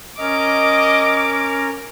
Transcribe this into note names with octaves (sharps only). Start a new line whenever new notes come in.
C#4 A#4 D#5 A#5 D6